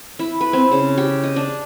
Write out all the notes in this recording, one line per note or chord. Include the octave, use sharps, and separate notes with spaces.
E4
B4
C4
C#3
G4
D#5
D4